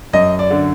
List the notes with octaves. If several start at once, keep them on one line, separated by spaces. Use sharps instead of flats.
F#2 D#5
D5
D3